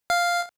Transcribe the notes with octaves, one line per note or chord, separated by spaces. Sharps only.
F5